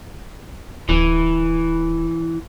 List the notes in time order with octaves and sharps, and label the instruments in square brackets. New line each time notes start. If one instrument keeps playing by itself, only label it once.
[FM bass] D1 [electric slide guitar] E3